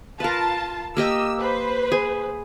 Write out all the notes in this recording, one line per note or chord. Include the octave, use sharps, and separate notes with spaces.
F4 A#4 B4 A5
A#3 G4 D#5 E6
B4 C5
G#4 G#5